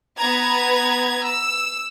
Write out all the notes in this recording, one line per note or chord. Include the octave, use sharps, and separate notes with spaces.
B3 B4 A#5 G#6
E6